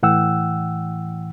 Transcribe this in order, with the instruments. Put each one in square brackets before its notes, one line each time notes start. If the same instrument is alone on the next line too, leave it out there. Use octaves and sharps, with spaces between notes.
[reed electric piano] A2 E3 F#5 G5 E6